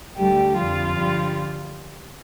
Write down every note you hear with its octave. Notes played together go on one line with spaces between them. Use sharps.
D2 D3 G3 A3 G4
F2 D3 F3 G3 F4
G2 D3 G3